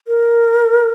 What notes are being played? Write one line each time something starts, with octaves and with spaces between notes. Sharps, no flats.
A#4